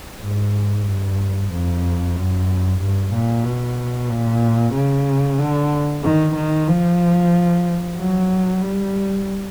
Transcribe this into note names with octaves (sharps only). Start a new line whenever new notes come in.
G#2
G2
F2
F#2
G2
A#2
B2
A#2
C#3
D3
D#3
D#3
F3
F#3
G3